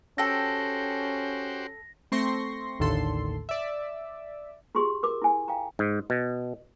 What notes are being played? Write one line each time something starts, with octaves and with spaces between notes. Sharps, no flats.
C#4 F#4 G4 A4 C5 G5 A#6
A3 C4 C6 C#6 A#6
A1 D#2 A2 D3 A4 C6
D5 E5
F4 G4 G#4 C6 C#6
A#4 D6
E4 G#5
F5 G5 A#5
G#2
B2